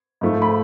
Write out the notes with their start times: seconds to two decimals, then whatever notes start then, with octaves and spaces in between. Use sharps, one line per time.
0.21 G#2 F3 A3
0.42 B5